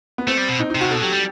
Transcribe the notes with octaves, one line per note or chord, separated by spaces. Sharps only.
B3
A3 C4
G3
B2
D#4
D#4
C3
F#4
B2 A4
F#3 G4
G3